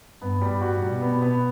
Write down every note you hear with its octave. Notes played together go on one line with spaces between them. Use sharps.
G2 B3
G3
G2
F#4
B2 G3
B3
B3